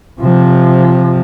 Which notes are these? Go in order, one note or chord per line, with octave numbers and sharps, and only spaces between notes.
C3 F3